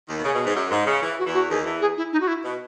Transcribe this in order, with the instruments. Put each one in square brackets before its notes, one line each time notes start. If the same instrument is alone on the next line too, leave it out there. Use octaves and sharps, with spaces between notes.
[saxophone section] D#2 D#3
B2
[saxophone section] C#3 [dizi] G#4
[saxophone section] B2
G#2
F#2
G#2
C#3
E3
[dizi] F#4
[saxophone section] E2 E3
[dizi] F#4
[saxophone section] D#2 D#3 [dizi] G#4
[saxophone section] E2 E3
[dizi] G#4
E4
D#4
F#4
E4
[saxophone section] B2